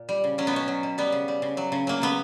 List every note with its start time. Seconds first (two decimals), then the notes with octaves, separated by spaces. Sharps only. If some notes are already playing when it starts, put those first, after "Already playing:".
Already playing: A#2
0.09 G3
0.24 C#3
0.38 F#3 C#4
0.47 B3
0.53 B2 C#4
0.68 F#3
0.83 B2
0.98 G3 B3
1.12 C#3
1.28 G3
1.42 C#3
1.57 F#3
1.72 C#3
1.87 F#3 A#3
2.02 C#3 B3